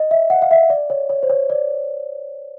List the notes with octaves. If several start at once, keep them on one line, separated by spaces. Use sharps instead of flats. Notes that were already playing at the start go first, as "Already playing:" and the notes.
Already playing: D#5
E5
F#5
F5
E5
D5
C#5
C#5
C5
C#5
D5